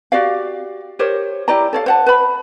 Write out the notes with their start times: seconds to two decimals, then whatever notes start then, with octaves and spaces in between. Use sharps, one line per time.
0.12 F#4 G4 D5 F5
0.99 G4 A#4 C5 C#5
1.48 E4 G4 D5 A#5
1.73 A4 C#5 F5
1.86 C5 F#5 A5
2.06 B4 B5